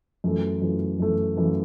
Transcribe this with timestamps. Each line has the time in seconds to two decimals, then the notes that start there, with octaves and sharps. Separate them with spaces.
0.24 F#2 E3 A3
0.62 F#2 E3 A3
1.00 F#2 E3 A3
1.37 F#2 E3 A3